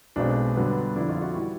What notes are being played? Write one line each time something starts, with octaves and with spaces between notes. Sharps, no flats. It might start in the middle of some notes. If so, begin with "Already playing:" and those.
B1 B2 G#3 C4 D4
G2 D3 F#3 B3
F2 D3 F3 D4 E4
D#4 F4
E4 F#4
E3 G3 E4 F#4